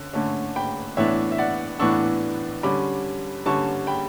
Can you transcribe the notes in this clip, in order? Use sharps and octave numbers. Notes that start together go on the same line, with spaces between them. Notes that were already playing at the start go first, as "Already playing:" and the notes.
Already playing: D3 C#4
D3 A3 C#4
G5 B5
A2 E3 B3 D4 C#5 E5
E5
D5 F#5
A2 E3 B3 D4 C#6 E6
D3 G3 C#4 B5 D6
D3 G3 C#4 A5 C#6
G5 B5